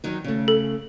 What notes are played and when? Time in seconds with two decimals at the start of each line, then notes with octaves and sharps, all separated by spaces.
0.04 D#3 F#3 D#4
0.24 C#3 A3
0.48 A4